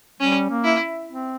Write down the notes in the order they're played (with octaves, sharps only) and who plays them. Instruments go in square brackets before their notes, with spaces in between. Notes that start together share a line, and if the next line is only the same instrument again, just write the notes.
[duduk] G3 [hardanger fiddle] C#4
[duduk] A#3
[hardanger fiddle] E4
[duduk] C4